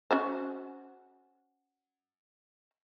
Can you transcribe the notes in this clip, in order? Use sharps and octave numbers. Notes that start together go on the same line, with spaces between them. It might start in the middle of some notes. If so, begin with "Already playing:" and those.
C#4 F#4 C5